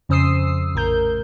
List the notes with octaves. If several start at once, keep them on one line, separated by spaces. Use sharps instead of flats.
F2 C#3 C5 D#6 E6 C7
A#1 A2 A#4 G6